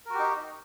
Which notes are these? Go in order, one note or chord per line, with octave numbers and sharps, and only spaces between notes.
D#4 F#4 G4 A#4